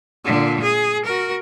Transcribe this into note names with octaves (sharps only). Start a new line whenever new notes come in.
A#2 D3
G#4
F#4 A#4